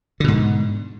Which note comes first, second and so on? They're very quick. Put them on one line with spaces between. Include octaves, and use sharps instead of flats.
D3 B2 G#2